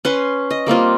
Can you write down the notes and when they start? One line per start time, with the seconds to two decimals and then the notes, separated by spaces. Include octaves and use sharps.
0.05 C#4 B4 C6
0.50 D#5
0.66 G3 A#3 C4 F4